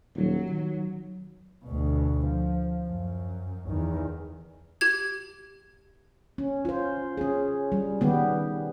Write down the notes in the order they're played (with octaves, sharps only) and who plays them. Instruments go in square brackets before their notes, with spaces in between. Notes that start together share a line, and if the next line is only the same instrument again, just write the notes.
[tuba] D#1 [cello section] F#3
[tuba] D#3
[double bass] D2 B2
F3
F#2
E2 D#3
[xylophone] G4 G#6
[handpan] C#4
F4 C5
C#4 G#4
G3
D#3 G3 B3 G4